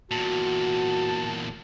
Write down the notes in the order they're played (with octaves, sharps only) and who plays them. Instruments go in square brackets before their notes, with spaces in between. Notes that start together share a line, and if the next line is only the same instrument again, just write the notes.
[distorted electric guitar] E2 A#2 [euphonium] F#4 [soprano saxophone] A5